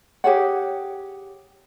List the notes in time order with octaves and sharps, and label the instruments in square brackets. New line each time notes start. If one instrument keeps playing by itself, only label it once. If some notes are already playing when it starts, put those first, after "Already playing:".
[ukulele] G4 G#4 C#5 F#5